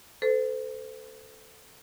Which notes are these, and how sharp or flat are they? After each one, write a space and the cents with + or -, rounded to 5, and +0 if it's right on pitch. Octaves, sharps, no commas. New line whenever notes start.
A4 +0 C5 -35